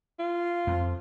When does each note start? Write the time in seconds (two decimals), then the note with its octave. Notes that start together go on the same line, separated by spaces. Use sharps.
0.19 F4
0.67 F2